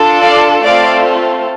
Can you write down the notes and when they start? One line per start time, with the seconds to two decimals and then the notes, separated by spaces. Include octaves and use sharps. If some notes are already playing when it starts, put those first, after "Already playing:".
Already playing: D4 F4 A4
0.22 D5 F5
0.64 A3 C4 F4 A4 D5 F5